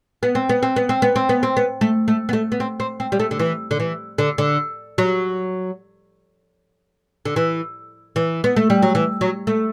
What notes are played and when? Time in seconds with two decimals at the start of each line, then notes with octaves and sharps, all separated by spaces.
0.23 B3
0.35 C4
0.49 B3
0.63 C4
0.76 B3
0.89 C4
1.02 B3
1.16 C4
1.29 B3
1.43 C4
1.57 B3
1.81 A3
2.08 A3
2.29 B3
2.33 A3
2.52 B3
2.60 C4
2.80 C4
3.00 C4
3.12 G3
3.20 A3
3.31 D3
3.39 E3
3.71 D3
3.80 E3
4.18 D3
4.38 D3
4.98 F#3
7.25 D3
7.36 E3
8.16 E3
8.44 B3
8.56 A3
8.70 G3
8.82 F#3
8.95 E3
9.21 F#3
9.47 A3